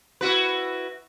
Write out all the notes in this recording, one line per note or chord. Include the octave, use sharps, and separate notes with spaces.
E4 F#4 B4